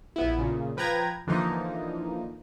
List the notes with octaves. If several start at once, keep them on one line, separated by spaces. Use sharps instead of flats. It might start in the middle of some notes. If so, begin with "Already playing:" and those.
A#1 B3 E4
A#2 C#3
F3 B4 G5 A#5 G#6
D3 E3 F3 A#3 D#4